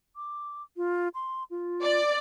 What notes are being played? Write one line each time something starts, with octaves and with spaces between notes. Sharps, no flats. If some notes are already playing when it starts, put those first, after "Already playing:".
D6
F4
C6
F4
D5